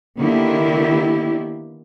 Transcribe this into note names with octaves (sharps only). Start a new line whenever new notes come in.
D3 D#3 A#3 B3 E4 G4